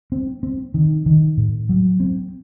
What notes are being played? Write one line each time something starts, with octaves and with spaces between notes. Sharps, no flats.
C4
C4
D#3
D#3
A2
F#3
C4